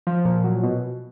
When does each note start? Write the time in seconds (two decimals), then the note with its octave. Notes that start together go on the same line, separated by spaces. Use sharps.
0.07 F3
0.25 A#2
0.44 F#3
0.63 B2